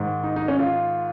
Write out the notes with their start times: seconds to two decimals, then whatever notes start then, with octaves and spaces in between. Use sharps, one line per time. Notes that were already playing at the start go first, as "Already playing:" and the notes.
Already playing: G#2 D#3
0.24 D#4
0.36 D#4
0.48 C#4
0.59 F4